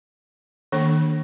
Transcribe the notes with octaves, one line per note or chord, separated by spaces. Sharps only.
D#3 A#3 D4 A4